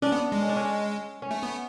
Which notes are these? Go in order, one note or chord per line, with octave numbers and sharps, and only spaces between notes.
C#4 D4
B3
G#3
C#4
D4
C#4
C#4
A3
B3